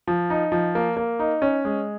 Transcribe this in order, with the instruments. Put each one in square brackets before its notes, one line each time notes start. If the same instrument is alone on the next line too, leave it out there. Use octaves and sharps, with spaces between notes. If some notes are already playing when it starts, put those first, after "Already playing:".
[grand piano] F3
D#4
F3
A#3
A#3
D#4
C#4
G#3